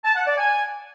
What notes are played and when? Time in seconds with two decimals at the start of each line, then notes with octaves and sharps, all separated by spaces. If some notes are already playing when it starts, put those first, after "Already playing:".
0.05 A5
0.16 F#5
0.27 D5
0.38 G#5